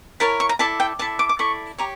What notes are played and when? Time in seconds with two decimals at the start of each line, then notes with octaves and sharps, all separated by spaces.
0.20 E4 A#4 C#5 A5
0.40 C#6
0.49 A#5
0.59 E4 A4 D5 A5
0.80 G5
0.99 E4 A4 D5 A5
1.19 D6
1.29 D6
1.39 E4 A4 D5 C#6
1.78 G4 C#5 A#5